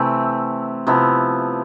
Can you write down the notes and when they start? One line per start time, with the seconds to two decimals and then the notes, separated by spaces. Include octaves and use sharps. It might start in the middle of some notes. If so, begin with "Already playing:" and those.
Already playing: C3 E3 A3 C4
0.87 C3 F3 B3 E4